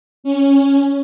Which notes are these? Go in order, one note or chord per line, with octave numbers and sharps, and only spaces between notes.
C#4